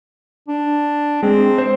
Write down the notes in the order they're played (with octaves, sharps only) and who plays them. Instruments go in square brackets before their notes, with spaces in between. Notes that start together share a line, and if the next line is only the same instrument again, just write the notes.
[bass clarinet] D4
[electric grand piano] G#3 [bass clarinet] C4
[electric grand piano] C5